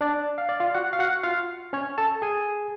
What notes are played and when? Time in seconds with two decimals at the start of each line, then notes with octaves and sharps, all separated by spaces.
0.01 D4 D5
0.38 F5
0.49 D5
0.60 F4 F5
0.75 F#4 F#5
0.93 F5
0.99 F#4 F#5
1.23 F4 F5
1.73 C#4 C#5
1.98 A4 A5
2.22 G#4 G#5